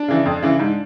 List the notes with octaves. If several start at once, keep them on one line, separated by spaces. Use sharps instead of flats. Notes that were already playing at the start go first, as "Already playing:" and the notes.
Already playing: D4
C#3 E3
F2
C#3 E3
G#2